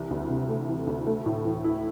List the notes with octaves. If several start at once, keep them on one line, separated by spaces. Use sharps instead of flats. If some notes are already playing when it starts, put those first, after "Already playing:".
Already playing: C2 E3
D2
C3
A3
E3
D2
A3
A2
E3
E4